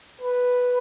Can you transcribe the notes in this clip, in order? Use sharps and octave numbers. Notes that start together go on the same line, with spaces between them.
B4